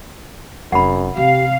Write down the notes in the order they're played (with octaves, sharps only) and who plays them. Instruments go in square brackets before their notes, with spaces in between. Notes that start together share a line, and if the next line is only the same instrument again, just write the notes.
[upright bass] F1 [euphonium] F#2 [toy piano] F#5 B5
[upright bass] C3 [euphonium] G4 [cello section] F5